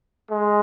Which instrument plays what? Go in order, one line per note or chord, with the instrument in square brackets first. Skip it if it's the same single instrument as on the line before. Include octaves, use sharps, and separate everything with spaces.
[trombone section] G#3